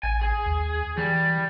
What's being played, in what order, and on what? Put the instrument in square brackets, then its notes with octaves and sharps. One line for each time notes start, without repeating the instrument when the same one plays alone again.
[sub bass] A1 [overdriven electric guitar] G#5
[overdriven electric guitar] G#4
[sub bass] D#2
[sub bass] E3 [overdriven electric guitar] G3